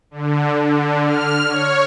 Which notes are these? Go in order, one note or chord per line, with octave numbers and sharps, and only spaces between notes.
D3
D3
F6
C#5